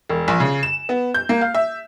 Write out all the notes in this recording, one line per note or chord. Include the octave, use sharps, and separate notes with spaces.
E1
A#1
C#3
E7
B3
G6
A#3
F5
E5